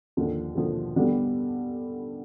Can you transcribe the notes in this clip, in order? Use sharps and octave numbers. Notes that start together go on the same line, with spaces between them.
D#2 D3 F3
D#2 D3 F3
D3 G3 B3